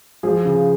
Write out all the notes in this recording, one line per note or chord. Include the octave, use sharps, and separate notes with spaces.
F3 G#4
C#3